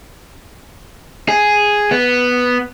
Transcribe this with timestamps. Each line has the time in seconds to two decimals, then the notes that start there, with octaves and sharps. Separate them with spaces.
1.29 G#4
1.91 B3